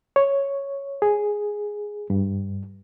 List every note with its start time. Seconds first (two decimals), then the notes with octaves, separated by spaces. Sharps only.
0.16 C#5
1.02 G#4
2.10 G2